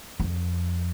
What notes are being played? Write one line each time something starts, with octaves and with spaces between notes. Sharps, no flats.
F2